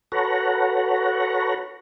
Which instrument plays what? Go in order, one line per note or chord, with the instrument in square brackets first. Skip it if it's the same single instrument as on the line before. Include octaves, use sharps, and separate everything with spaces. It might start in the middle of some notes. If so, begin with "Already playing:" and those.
[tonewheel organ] F#4 A4 B4 C#5 F#5 A#5